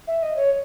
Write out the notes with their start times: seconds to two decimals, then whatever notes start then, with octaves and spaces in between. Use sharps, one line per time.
0.07 E5
0.22 D#5
0.36 C#5